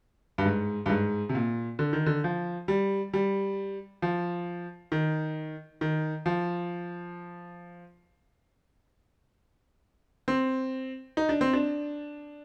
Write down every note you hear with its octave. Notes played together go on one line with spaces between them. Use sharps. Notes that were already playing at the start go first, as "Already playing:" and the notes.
G2
G#2
G2
G#2
C3
A#2
D3
D#3
D3
F3
G3
G3
F3
D#3
D#3
F3
C4
D#4
D4
C4
D4